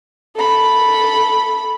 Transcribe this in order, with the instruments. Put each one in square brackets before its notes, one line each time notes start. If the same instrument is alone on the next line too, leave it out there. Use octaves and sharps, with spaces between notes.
[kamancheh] A4 B5